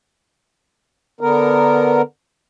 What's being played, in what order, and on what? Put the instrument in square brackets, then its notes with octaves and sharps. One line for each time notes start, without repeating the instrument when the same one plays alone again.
[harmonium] D3 B3 A#4